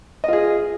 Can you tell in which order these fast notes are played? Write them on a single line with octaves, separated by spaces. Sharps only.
D#5 F4 G#4